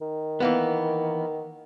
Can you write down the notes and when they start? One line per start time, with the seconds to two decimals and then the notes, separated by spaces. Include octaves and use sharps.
0.01 D#3
0.40 E3 A#3 B3